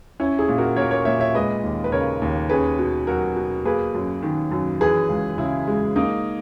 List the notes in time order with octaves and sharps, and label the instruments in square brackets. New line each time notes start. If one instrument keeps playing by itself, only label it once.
[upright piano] C#4 E4
E4 G#4
A#2
F#4 A#4
A#3 A#4 C#5
A#4 C#5
A#2 C#5 E5
C#5 E5
G#3 B4 D#5
D#2
B4
C#3 A#4 C#5
D#2
C#4 G#4 B4
B2
F#3 F#4 A#4
B2
A#3 G#4 B4
F#2
D#3
F#2
E3 G#4 B4
C#2
C#3 E4
G#3
A#3 D#4